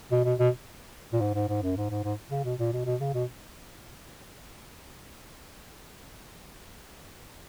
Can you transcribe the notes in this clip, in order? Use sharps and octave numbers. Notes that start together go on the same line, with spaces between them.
B2
B2
B2
A#2
G#2
G#2
G#2
F#2
G#2
G#2
G#2
C#3
B2
A#2
B2
B2
C#3
B2